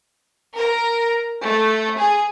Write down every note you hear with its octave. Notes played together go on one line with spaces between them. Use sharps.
A#4
A3
G#4